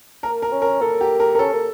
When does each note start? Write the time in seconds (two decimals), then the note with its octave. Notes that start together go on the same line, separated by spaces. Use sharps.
0.23 A#3 A#4
0.42 A#4
0.52 C#4
0.62 A#4
0.81 A#3 A4
1.01 G4
1.20 A#4
1.35 A#4
1.39 C#4 A4
1.53 A#3